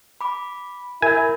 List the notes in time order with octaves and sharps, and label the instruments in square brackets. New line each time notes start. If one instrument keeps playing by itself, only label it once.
[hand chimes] B5 D6
[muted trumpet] E4 [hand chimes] A#4 E5 G6 [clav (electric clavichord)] G#5